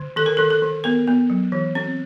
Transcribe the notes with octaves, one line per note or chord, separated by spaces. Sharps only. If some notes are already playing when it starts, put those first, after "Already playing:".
Already playing: D3
D#3 A4
A#4
D#3 A4
A4
D#3
B3 A#4
B3
F#3
E3
C4